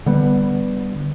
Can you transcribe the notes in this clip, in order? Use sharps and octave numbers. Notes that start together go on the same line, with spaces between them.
D3 G3 B3